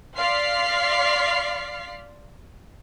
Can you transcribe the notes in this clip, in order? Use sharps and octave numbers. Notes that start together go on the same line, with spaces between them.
D5 F5 C6 F6 B6 C7